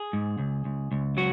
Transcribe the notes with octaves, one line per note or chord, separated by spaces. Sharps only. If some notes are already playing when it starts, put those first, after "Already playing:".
Already playing: G#4
G#2
C#2
C#2
C#2
F#3 F#4